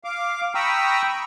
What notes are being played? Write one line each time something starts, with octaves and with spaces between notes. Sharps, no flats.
F5 D6
G5 A#5 B5 C#6 D#6 E6